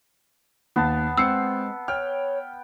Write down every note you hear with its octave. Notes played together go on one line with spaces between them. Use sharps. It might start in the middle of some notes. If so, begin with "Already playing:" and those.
D#2 B3 A5
G#3 C4 E6 C7 C#7
C#5 G5 F6